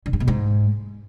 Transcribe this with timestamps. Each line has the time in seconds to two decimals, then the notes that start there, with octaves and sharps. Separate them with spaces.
0.06 D3
0.13 G2
0.20 B2
0.28 G#2